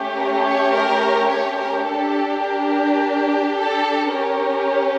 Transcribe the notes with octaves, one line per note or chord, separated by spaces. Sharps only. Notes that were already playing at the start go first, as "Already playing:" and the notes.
Already playing: A3 C#4 G4
A#4
C#5
A#4
C#5
A#4
D4 G4 A4
A#4
A4
C#4 G4 A#4